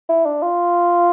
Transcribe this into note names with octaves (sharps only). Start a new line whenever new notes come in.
E4
D4
F4